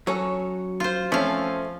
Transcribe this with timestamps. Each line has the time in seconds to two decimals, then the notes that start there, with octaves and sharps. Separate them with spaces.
0.07 F#3 C#4 A4
0.80 F4 C5
1.12 F3 A3 C4 C#4 F5